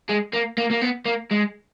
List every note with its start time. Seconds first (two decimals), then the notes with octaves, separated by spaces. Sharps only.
0.09 G#3
0.33 A#3
0.58 A#3
0.71 A#3
0.81 B3
1.05 A#3
1.31 G#3